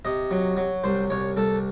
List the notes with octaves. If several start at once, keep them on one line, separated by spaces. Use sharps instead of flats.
C3 D#5
F#3
F#3
C2 C5
C2 C#5
C2 A4